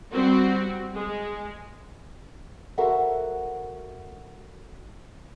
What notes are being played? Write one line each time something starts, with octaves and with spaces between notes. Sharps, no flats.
G3 C4 F#4
G#3
F#4 A4 A#4 C5 E5 F#5